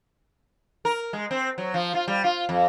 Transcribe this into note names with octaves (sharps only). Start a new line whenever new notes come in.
A#4
G#3
C4
F#3
F3
F4
G3
F4
F2